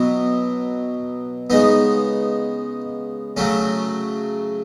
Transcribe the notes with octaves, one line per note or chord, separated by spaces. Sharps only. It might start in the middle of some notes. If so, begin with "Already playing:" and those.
Already playing: B2 F#3 B3 E4
C#3 G#3 B3 D#4
C#3 F#3 A3 C#4